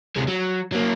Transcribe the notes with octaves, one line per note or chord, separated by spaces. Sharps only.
C3 G#3
F#3
F#3 A#3